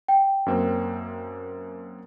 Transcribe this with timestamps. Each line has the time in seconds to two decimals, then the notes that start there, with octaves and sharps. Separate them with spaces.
0.08 G5
0.46 F#2 A#3 C4